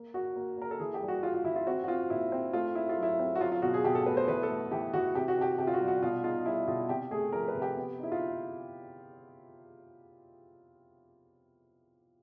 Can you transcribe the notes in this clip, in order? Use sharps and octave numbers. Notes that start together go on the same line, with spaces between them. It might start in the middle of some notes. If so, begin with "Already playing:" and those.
Already playing: A#3
A#3 F#4
A#3
A#3 A#4
A4
E3 G#4
G4
G3
F#4
G3 F4
F4
E3 E4
F4
C4 F#4
F#4
C4 F4
A#2 E4
C4
A3 F4
A3 E4
F4
F#3 E4
C4
F#4
F#3 F4
F4
B2 F#4
G#4
B2 G4
A4
A3 B4
C5
E3 B4
A4
A3
E3 G4
E3 F#4
C3 G4
F#4
C3 G4
C3 G4
F4
F#4
G3
F#4
B2 F4
D#4 F4
G3 E4
B2 F4
C3 G4
A3 G#4
F3 A#4
B4
C3
G4
B3
D#4 E4
F4